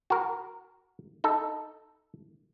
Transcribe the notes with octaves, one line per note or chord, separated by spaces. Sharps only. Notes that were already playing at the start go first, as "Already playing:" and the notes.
F#4 A#4
D#4 A4